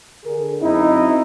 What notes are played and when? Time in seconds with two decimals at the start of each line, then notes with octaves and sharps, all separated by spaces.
0.24 D3 G#4 A#4
0.62 F#2 C4 D#4 E4 D#5